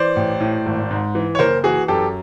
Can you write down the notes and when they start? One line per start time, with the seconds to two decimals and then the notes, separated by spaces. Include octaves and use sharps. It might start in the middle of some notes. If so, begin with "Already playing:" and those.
Already playing: E3 C5 D5
0.16 A1
0.40 A2
0.66 G#1
0.91 G#2
1.15 E3
1.35 C#5
1.39 F#1 A#4 C5
1.64 E3 F#4 G#4
1.88 F#2 G4 A4